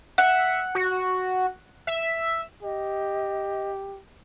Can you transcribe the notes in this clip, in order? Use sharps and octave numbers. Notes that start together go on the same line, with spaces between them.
E5 F#5
F#4
E5
G4 D#5